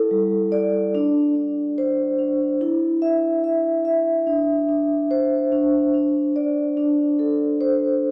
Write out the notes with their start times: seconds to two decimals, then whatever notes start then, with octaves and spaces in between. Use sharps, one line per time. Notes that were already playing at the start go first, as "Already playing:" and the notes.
Already playing: E4 A4
0.11 G3
0.52 D5
0.95 D4
1.35 D4
1.78 C5
2.19 D4
2.61 E4
3.02 E5
3.44 E5
3.85 E5
4.27 D4
4.69 D4
5.11 C5
5.52 D4
5.94 D4
6.36 D5
6.77 D4
7.19 A4
7.61 C5